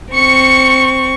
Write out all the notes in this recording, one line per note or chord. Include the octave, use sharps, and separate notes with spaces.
C4 C#6 C#7